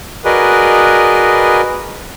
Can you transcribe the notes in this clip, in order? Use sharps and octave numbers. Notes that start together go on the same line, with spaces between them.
F#4 G#4 A#4 B4 D5 D#5